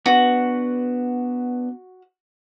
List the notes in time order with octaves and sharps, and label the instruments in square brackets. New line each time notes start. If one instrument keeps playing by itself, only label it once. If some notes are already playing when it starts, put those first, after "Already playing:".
[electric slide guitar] B3 D4 B4 [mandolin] F#4